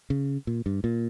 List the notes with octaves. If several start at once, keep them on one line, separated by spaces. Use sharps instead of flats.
C#3
A#2
G2
A#2